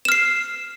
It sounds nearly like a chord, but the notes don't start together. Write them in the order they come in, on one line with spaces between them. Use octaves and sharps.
E7 F6 C7